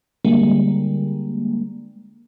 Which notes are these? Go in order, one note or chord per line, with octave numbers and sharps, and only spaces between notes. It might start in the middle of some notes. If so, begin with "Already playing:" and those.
D3 G3 G#3 A#3